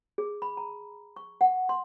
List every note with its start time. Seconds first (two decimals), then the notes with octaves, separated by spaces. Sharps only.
0.18 G#4
0.42 B5
0.57 A#5
1.16 C#6
1.41 F#5
1.69 C6